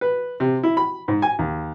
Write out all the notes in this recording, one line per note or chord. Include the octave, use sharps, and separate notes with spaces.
B4
C3
E4
B5
G#2
G#5
D#2